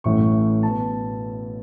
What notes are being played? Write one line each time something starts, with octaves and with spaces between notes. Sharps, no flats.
A1 A2 E3 A3 C#6
B2 B3 A5